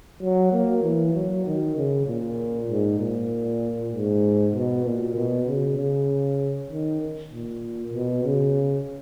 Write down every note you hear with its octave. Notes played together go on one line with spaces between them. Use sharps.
F#3
A#3
E3
F#3
D#3
C#3
A#2
G#2
A#2
G#2
B2
A#2
B2
C#3
C#3
D#3
A#2
B2
C#3